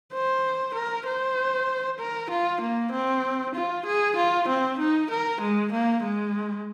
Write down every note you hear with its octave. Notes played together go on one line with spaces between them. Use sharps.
C5
A#4
C5
A#4
F4
A#3
C4
F4
G#4
F4
C4
D#4
A#4
G#3
A#3
G#3